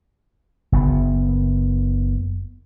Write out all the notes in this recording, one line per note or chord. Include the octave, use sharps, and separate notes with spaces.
F#1 B3